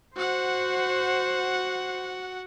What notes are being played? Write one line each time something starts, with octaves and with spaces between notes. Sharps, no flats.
F#4 C5 F#5